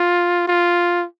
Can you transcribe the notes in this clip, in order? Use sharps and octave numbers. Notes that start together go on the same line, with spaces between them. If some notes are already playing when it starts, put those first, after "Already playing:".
Already playing: F4
F4